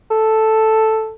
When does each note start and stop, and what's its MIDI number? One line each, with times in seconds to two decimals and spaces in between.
0.11 1.13 69